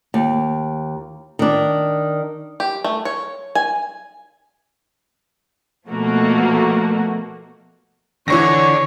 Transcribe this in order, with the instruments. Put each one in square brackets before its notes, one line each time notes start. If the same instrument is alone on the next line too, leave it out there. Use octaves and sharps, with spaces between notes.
[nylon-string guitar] D#2
D#3 D4
[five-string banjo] G4
A3
C#5
G#5
[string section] B2 F3 A3 A#3 F#4
[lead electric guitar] D3 [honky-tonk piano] E3 C#6 A#6 [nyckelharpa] C#5